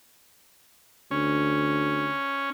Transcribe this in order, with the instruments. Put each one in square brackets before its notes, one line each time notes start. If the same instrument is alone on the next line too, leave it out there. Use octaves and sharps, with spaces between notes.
[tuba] D2 [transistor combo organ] C#4